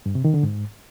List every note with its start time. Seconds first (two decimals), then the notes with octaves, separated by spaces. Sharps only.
0.06 G2
0.15 C3
0.25 D#3
0.34 D3
0.43 G#2